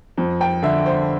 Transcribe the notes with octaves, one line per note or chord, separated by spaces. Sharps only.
F2
G5
D3 E5
C5